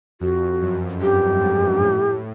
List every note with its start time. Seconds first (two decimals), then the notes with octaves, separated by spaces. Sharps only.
0.20 F2 F#4
0.61 F#2
1.01 G2 G4
1.40 G#2
1.80 A2